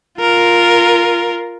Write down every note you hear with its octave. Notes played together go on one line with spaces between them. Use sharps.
F4 A#4